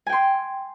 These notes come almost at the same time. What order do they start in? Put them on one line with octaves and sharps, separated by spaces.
G#5 G5 C6